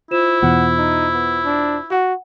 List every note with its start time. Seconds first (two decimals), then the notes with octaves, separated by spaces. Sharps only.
0.11 E4 F4 C5 E7
0.42 E2 B2 F#5
0.78 D#4
1.14 B3
1.44 D4
1.91 F#4 F#5